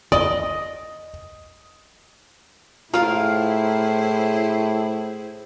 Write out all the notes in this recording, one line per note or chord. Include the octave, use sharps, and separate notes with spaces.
D5 D#5 D#6
A2 E4 F4 G#4 A#4 C5 F5